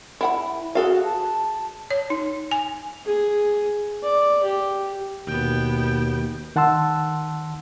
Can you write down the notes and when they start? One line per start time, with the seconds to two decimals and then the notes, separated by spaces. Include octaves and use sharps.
0.21 E4 F#5 B5
0.75 F#4 G#4 A4 F5
1.05 A5
1.91 C#5
2.10 D#4
2.51 G#5
3.06 G#4
4.03 D5
4.43 G4
5.27 D#2 B2 B3 G5
6.56 D#3 F#5 A5 C6 E6